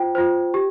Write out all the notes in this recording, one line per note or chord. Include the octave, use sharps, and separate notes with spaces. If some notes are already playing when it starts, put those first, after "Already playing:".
Already playing: F4 C5 G5
F4 C5
G4